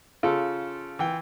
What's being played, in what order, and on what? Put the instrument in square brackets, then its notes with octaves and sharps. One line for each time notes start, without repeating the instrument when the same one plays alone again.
[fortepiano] C#3 A4 [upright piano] F4
[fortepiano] E3 G5